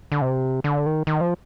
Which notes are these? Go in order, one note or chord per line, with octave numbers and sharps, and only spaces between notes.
D3
C3
D3
D#3
D#3
F3